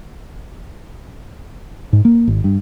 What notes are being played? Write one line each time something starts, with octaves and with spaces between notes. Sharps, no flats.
G#2
A#3
G#1
G2